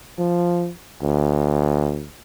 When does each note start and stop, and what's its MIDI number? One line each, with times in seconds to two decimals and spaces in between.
0.18 0.70 53
1.02 2.07 38